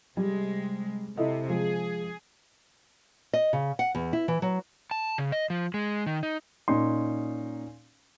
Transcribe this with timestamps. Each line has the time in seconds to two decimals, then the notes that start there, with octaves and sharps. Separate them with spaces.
0.17 C3 G3 G#3
1.17 C3 E4 A4 D#5
1.49 F3 G#3 G#4
3.33 D#5
3.53 C#3
3.79 F#5
3.95 E2
4.13 E4
4.28 E3
4.42 F#3
4.91 A5
5.18 C#3
5.32 D#5
5.50 F3
5.74 G#3
6.07 D#3
6.23 D#4
6.68 A#2 C#4 D#4 C6